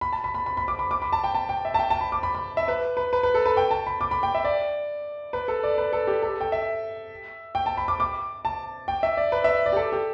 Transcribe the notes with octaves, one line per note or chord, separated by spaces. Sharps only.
B5
A5
B5
B5
B5
B5
D6
B5
D6
B5
A5
G5
A5
G5
E5
A5
G5
A5
B5
D6
B5
B5
E5
B4
B4
B4
B4
A4
B4
G5
A5
B5
D6
B5
G5
E5
D5
B4
A4
D5
B4
A4
G4
A4
G5
E5
G5
A5
B5
D6
D6
A5
G5
E5
D5
B4
E5
D5
G4
A4
G4